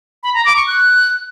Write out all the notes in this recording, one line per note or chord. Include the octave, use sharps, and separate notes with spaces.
B5
A#5
D6
C#6
F#6